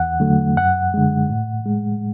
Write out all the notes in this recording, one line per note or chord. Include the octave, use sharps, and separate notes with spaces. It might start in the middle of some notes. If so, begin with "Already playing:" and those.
Already playing: E2 F#5
D3 F#3 A3
F#2 F#5
D3 G#3
A2
G#3